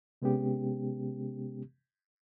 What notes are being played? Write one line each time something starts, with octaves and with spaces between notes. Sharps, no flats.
C3 G#3 B3 C#4 G4